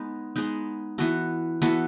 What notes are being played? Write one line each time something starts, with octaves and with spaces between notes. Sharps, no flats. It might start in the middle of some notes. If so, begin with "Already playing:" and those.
Already playing: G#3 B3 D#4
G#3 B3 D#4
E3 B3 F#4 A4
E3 B3 F#4 A4